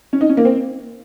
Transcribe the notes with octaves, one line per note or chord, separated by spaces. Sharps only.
C#4
D#4
C#4
A#3
C4